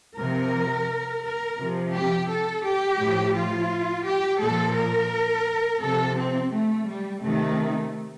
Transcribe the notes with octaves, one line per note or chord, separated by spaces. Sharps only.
C3 F3 A#4
A#4
C3 F3
G4
A4
G4
A2 F3
F4
G4
A#2 F3 A4
A#4
C3 F3 A4
C4
A3
G3
C3 D#3 A3